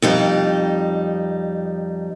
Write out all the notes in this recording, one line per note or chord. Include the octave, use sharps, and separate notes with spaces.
F2 G3 D#4